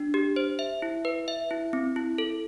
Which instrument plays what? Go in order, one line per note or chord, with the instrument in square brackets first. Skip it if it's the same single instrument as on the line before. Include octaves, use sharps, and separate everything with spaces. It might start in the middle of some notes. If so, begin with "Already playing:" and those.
Already playing: [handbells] D4
G4
C5
E5
E4
B4
E5
E4
C4
E4
A4